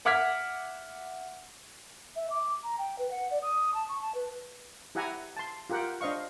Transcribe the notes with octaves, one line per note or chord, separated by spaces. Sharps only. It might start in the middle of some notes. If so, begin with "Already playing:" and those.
E5 F#5 D6 F6 G#6 B6
E5
D6
A#5
G5
B4
F#5
D5
D#6
A5
C#6
A5
B4
E4 G4 E5 F#5 G#5 A#5
A5 C6
F4 G4 A#4 F#5 G5
D4 C5 D#5 F5 C#6